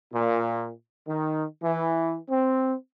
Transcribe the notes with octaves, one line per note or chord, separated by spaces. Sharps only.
A#2
D#3
E3
C4